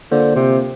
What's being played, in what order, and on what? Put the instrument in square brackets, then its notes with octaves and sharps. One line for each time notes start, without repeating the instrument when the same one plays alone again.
[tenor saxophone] D3 [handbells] A#3 F4 C5
[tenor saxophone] C3